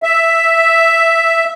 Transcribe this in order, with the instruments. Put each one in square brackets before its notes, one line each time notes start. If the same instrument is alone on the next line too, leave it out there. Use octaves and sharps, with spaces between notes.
[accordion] E5